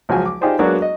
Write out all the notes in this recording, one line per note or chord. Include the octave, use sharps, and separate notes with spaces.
C#2 F3 F#3 G#3 F#4 G#5
D6
D#4 F4 G4 G#4 C5 D5
F#3 G#3 A#3 B3 D4 F#4
D#5